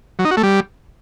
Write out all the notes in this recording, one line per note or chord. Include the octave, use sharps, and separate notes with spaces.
F#3
D#4
F#4
A3
G3